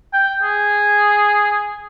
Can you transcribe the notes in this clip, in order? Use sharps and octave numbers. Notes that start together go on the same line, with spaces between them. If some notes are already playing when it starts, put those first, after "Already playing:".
G5
G#4